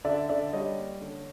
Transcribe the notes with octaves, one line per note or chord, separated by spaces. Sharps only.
D3 D5 E5
D3 D5 E5
G3 C#5 D#5
A#3
D3